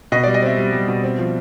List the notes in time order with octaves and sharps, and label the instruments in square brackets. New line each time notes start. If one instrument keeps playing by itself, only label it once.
[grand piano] B2 D#5
G3 D5
D#5
C4 E5
G3
G3
B2
C4
F3